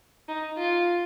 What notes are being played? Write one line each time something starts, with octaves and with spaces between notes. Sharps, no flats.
D#4
F4